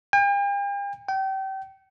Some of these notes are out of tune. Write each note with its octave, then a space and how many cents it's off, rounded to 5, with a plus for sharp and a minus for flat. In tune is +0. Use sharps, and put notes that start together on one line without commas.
G5 +45
G5 -30